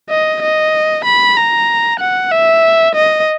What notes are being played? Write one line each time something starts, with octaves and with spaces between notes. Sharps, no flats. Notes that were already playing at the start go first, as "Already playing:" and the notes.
D#5
D#5
B5
A#5
F#5
E5
D#5